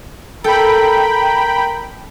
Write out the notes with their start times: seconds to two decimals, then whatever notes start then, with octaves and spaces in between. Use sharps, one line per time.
0.44 A4 A#4 G5 A#5 B5